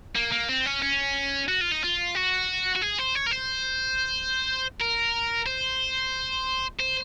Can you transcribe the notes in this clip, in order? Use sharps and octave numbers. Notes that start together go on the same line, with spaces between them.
A#3
A#3
C4
C#4
C#4
F#4
F4
D#4
F4
F#4
F#4
G#4
C5
C#5
A#4
C5
A#4
C5
C5